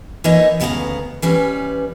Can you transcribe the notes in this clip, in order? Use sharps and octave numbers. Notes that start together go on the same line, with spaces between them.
E3 A#3 D#4 C#5 D#5 E5
D2 C#3 B3 A4 F5 A#5
E3 G3 C#4 B4